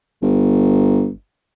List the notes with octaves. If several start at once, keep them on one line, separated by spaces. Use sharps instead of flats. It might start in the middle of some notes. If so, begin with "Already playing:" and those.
G1